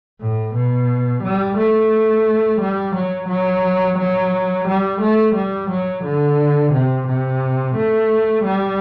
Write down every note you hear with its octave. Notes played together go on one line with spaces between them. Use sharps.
A2
B2
G3
A3
G3
F#3
F#3
F#3
G3
A3
G3
F#3
D3
C3
C3
A3
G3